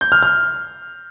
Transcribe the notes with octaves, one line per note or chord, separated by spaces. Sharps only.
G6
F6
F6